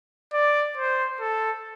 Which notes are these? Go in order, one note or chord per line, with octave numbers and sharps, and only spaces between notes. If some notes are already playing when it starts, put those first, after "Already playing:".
D5
C5
A4